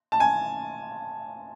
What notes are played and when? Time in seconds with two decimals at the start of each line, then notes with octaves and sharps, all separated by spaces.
0.12 A5
0.20 G#5